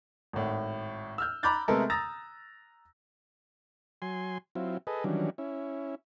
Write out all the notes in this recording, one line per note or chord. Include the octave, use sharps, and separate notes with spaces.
G#1 A2
E6 F6 G6
A#5 B5 D6 F#6 G6 A6
C3 G#3 A3 B3 A4 A#4
A#5 D#6 E6 A6 A#6
F#3 G#5 C6
F#3 C4 E4 F4
G#4 A4 B4 D#5
D#3 E3 F#3 G3 C#4 D4
C#4 E4